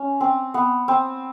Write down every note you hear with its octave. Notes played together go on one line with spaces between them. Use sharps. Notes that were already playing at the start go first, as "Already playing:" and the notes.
Already playing: C#4
C4
B3
C4